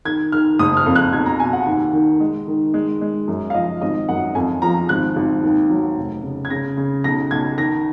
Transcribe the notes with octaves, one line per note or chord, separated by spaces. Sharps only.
D#3 G#6
D#3 F6
F#1 D#6
F6
F2
F#6
B1 G#6
A#5
B2 G#5
F#5
D#2
D#3
G#3
D#3
G#3
G#3
F#2
F5
F3 D#5
G#1 D#5
F#2 F#5
F2 G#5
F3 A#5
G#1 F#6
G#1
D#2
F#3
F1
C#3
G#6
C#3 A#6
C#3
B1 A#6
B1 G#6
D#3 A#6